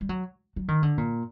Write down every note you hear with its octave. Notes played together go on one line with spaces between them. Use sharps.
G3
F#3
F#3
D#3
D3
A#2